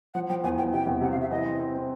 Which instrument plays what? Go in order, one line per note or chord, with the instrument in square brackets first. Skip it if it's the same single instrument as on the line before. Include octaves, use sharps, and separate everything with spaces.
[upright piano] F3 [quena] F#5
[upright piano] F3 [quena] G5
[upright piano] E2 [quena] G#5
[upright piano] E2 [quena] G5
[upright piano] C3 [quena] G5
[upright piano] E2
[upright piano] C3 [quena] F#5
[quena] F5
[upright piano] C3 [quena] E5
[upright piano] E3 [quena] D#5
[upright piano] C4
C4
C4